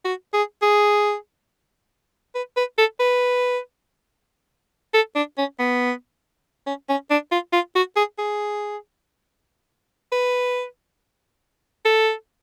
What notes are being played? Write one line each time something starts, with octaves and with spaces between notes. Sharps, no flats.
F#4
G#4
G#4
B4
B4
A4
B4
A4
D4
C#4
B3
C#4
C#4
D4
F4
F4
F#4
G#4
G#4
B4
A4